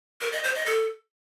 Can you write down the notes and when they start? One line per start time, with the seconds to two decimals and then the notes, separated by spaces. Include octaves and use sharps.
0.21 A#4
0.32 D#5
0.43 C5
0.55 D#5
0.66 A4